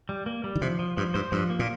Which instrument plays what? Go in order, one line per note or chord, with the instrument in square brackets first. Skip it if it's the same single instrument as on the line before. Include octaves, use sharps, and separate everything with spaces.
[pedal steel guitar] G3
A#3
G3
[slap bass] D#3
[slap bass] C3 [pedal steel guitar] F3
[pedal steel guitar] F3
[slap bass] G2 [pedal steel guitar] F3
[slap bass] G2 [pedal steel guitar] C5
[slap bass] G2 [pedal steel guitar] F3
[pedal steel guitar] A#3
[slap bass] A#2